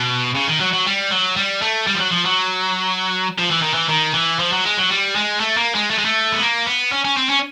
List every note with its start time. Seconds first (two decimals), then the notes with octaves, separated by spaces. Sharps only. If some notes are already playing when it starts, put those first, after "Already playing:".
Already playing: B2
0.36 C#3
0.48 D#3
0.61 F#3
0.73 F#3
0.87 G3
1.11 F#3
1.36 G3
1.62 A3
1.87 G3
1.95 F3
2.00 F#3
2.12 F3
2.25 F#3
3.38 F3
3.50 E3
3.62 D#3
3.73 E3
3.88 D#3
4.14 E3
4.39 F3
4.52 F#3
4.65 G#3
4.77 F#3
4.90 G3
5.15 G#3
5.40 A3
5.57 A#3
5.75 G#3
5.90 A3
5.98 G#3
6.05 A3
6.32 B3
6.42 A#3
6.67 B3
6.92 C#4
7.05 C#4
7.17 C4
7.30 C#4